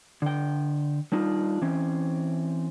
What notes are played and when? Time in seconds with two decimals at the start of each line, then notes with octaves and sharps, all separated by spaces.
0.22 D3 G5
1.12 G3 D4 D#4 F4
1.62 E3 C4 C#4